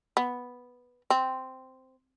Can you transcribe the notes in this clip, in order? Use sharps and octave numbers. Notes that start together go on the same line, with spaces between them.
B3
C4